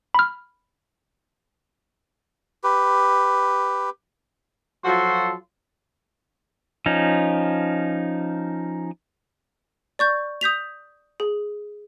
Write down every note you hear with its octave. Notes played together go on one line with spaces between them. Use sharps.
B5 F6
G4 B4
F3 F#3 F4 F#4 A4 C6
F3 C#4 D#4
D5 C#6 G6
D#6 G6 B6 F7
G#4